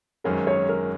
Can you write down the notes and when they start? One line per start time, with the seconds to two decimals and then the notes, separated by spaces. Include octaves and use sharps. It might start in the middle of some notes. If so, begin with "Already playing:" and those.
0.24 G#1 F#2 D#3 G#3 C#4 A#4
0.47 C#5
0.69 A#4